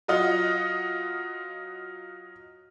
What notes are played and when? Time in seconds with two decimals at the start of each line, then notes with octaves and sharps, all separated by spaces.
0.08 F#3 F4 D#5 F#5